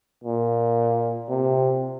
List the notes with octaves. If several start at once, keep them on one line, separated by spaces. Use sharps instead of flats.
A#2
C3